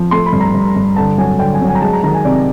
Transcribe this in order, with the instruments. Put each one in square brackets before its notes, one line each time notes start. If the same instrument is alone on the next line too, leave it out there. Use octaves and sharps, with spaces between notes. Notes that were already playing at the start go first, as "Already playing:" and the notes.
Already playing: [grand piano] F3
A3 C6
B5
G2
A#5
G2
G2
D3 A5
F#3 G#5
D3 G5
G#5
F#3
G#5
A#5
G#3 A5
A#5
D#3 A#5
G#5
C3 D5